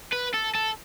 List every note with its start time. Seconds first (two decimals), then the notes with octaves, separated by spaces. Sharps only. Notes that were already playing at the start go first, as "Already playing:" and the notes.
0.13 B4
0.34 A4
0.55 A4